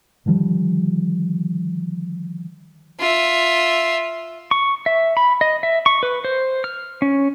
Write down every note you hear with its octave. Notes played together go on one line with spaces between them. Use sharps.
D3 D#3 F3 G3
F4 E5
C#6
E5
B5
D#5
E5
C#6
B4
C5
F6
C#4